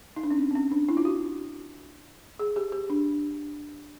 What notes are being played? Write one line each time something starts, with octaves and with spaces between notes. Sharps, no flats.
D#4
D4
C#4
C4
C4
C#4
D4
E4
F4
F#4
G#4
G4
G4
D4